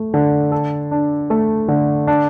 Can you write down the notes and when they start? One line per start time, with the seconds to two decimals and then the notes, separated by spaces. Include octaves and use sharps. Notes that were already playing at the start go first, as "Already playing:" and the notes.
Already playing: A3
0.14 D3
0.52 A4
0.91 D4
1.30 A3
1.68 D3
2.07 D4